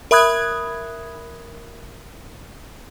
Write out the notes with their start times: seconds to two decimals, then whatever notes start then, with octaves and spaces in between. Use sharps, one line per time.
0.11 A#4 E5 B5 D#6 F#6 G#6